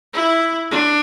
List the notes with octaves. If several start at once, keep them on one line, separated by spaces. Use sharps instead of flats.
E4
D4